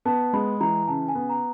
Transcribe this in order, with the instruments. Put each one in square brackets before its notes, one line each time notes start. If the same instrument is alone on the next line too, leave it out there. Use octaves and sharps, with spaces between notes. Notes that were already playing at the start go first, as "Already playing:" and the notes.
[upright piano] B3 [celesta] A5
[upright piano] G#3 [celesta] B5
[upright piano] E3 [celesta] A#5
[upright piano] C#3 [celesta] A5
[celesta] G#5
[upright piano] B3
[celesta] A#5